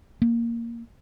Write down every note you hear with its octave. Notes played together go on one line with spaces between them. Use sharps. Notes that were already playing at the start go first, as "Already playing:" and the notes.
A#3